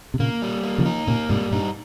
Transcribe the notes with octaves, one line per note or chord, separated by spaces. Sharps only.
C3
A#2 C#3 A#3
G3
A#3
C#3 F3
D#4
A#2 C#3 A#3
G#2 C3 G3
G2 A#2 D#4